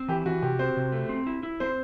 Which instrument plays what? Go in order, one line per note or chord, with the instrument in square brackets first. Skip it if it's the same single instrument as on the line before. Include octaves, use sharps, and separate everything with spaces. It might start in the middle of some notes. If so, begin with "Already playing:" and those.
Already playing: [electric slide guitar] C4
[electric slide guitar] E3 [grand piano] G4
[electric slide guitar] E3 [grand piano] F#4
[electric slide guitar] C3 [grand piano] G4
[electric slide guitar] C4 [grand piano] C5
[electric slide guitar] C3
A3
C4
E4
E4
[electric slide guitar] C4 [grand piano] C5